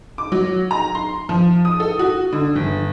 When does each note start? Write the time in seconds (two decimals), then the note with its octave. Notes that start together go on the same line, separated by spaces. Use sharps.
0.18 D6
0.32 F#3
0.71 A#5
0.95 C6
1.29 F3
1.65 D#6
1.80 A4
1.99 F#4
2.33 D3
2.56 G1